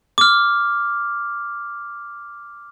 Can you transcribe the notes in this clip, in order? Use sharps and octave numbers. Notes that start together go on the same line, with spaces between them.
D6 F6